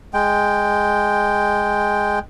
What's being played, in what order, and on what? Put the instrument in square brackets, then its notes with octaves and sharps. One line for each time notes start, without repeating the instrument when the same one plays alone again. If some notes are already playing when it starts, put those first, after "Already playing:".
[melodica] G#3 G5